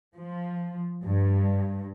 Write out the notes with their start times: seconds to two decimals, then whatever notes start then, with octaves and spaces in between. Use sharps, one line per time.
0.16 F3
1.04 G2